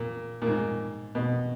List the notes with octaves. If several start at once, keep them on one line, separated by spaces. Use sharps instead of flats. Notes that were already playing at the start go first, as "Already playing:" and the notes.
Already playing: A#2
A#2
G#2
B2